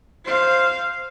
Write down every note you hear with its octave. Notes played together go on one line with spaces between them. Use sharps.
C5 F5